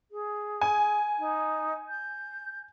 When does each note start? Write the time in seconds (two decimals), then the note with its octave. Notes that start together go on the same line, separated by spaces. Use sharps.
0.11 G#4
0.61 G#5
1.19 D#4
1.89 G6